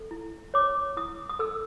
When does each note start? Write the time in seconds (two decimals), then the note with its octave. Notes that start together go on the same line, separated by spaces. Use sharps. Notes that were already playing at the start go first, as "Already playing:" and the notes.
Already playing: A4
0.11 E4
0.54 C#5 D6
0.97 E4 D#6
1.29 D#6
1.39 A4 E6